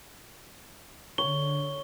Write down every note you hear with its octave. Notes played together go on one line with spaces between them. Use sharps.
D3 C#5 G7